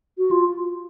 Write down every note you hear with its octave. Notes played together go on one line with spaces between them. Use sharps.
F#4
F4